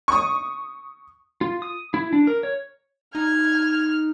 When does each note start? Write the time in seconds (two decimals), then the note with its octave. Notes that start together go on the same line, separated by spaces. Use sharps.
0.08 C#6 D#6
1.41 F4
1.62 D#6
1.94 E4
2.13 D4
2.27 A#4
2.43 C#5
3.15 D#4 F6 G#6